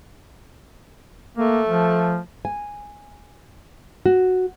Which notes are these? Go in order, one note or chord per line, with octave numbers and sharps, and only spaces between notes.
A3 A#3
F3
G#5
F#4